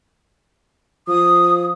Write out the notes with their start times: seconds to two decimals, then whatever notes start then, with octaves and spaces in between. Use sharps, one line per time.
1.08 F3 D#6